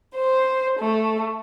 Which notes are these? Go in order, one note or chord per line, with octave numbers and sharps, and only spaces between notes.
C5
A3